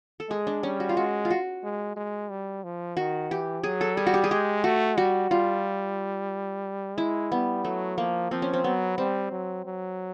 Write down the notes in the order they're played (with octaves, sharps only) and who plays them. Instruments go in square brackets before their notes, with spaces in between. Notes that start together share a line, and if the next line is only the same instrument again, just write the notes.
[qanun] A4
[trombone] G#3 [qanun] G#4
[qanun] D4
[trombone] G3 [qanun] C#4
[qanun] F#4
F4
[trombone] G#3 [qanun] F#4
[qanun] F4
F#4
[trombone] G#3
G#3
G3
F3
[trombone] D#3 [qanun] F#4
[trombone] E3 [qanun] G4
[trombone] F#3 [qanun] G#4
[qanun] A4
[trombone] G3 [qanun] G#4
[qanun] F#4
G4
G#4
[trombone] G#3 [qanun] G4
[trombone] A3 [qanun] F#4
[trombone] G3 [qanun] F#4
[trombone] G3 [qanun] F4
[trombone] G#3 [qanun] E4
[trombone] G3 [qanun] B3
[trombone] F#3 [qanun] A3
[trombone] F3 [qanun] A#3
[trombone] F3 [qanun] C4
[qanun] C#4
C4
[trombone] F#3 [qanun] B3
[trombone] G3 [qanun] C4
[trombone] F#3
F#3